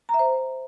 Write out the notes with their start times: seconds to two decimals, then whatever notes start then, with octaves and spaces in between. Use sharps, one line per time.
0.09 A#5
0.14 E5
0.19 C5